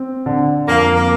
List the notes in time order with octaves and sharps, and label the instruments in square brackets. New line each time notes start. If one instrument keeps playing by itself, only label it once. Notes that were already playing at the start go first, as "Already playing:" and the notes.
Already playing: [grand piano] C4
D3
[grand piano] F2 [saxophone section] A#3
[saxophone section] A#3